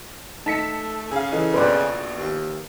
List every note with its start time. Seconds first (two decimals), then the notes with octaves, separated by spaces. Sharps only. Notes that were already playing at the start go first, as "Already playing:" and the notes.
0.46 A3 D#4 A5 B6 C#7
1.11 C#3 G#4 F5
1.32 E3 A4 D#5
1.54 A#1 B2 B4 C5 D5
2.18 D#2